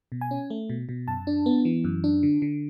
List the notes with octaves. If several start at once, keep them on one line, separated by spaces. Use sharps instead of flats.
B2
G#5
C#4
A3
B2
B2
F#2 A5
D4
B3
E3
F#2
D4
D3
D3